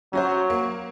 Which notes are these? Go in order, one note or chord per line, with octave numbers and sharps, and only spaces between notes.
F#3 C#4 F#4 C5
A#3